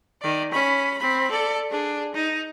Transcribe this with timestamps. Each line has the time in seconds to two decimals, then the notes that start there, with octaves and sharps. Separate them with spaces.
0.22 D#3 D5
0.52 C#4 B5
0.98 C4 B5
1.31 A4 D5
1.70 D4 G#4
2.15 D#4